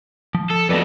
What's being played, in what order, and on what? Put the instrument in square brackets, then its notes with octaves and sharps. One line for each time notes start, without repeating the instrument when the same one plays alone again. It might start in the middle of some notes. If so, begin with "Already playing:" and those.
[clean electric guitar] F3
[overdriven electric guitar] A4
[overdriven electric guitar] F2 B2 [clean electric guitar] A4 B4 D5